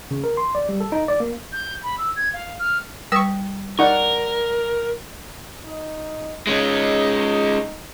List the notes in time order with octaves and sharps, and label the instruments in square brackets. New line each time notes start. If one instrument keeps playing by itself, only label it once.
[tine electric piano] C#3
A#4
C6
D5
G3
A4
D#4
D5
A#3
[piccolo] G6
B5
E6
G#6
F5
F6
[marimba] G3 B4 D#6 [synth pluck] C#6 E6
[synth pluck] D#4 [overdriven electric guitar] A#4 [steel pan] D5 F#5 C#6
[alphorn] D#4
[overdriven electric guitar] G#3 C#4 [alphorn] D#4